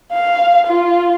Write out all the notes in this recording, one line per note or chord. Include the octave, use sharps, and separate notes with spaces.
F5
F4